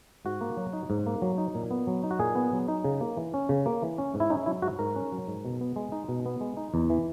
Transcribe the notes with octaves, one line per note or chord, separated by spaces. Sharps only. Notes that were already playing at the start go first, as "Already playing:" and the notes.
G#2 F#4
A#3
F#3
D#4
G#2
A#3
F#3
D#4
A#2
B3
F#3
D#4
F#4
A#2 G#4
B3
F#3
D#4
C#3
A#3
E3
C#4
C#3
A#3
E3
C#4
G#2
E4
C#4 D#4
F#3 E4
G#2 F#4
G#2 A#4
C#4
F#3
G#2
B2
B3
G#3
D#4
B2
B3
G#3
D#4
E2
E3